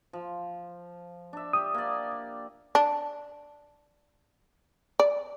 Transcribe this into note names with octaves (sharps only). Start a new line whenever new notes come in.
F3
D4 E5
G4 D#6
A#3 D5
D4
D5